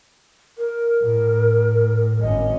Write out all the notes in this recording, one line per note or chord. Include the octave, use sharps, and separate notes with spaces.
A#4
A2
G#1 C#4 D#5